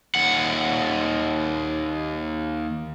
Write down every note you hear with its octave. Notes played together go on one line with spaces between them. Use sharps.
D#2 F#5